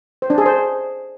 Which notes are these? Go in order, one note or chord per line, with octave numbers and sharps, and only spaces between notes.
C5
D4
G#4
C5